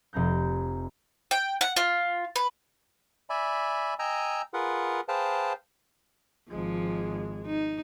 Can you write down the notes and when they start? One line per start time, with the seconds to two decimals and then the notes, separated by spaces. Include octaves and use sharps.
0.13 F1 C4 A#5 G6
1.31 G5
1.61 F#5
1.76 F4
2.36 B4
3.30 D5 E5 G#5 B5
3.99 D#5 G5 G#5 A#5 E6
4.54 F4 G#4 A#4 B4 F#5
5.08 G#4 B4 C5 F5 G5 A5
6.51 G#1 F3 G#3
7.46 D#4